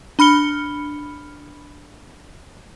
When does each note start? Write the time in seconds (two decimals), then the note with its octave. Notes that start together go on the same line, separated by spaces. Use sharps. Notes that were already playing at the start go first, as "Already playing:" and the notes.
0.19 D4 B5 F6 C#7 G7